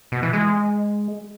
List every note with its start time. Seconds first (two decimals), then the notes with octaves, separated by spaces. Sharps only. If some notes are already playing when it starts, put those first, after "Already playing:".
0.12 B2
0.23 E3
0.33 G#3